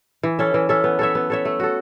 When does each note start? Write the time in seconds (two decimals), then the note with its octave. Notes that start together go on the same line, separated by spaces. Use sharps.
0.23 E3
0.39 C#4 A4 E5
0.54 E3
0.69 C#4 A4 E5
0.84 B3
0.99 A4 C#5 E5
1.15 B3
1.30 A4 C#5 E5
1.45 A3
1.60 F#4 A4